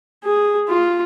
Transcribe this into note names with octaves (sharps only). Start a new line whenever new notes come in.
G#4
F4